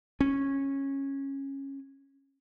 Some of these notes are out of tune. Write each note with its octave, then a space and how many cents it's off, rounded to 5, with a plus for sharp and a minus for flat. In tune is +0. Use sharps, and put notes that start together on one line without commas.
C#4 -15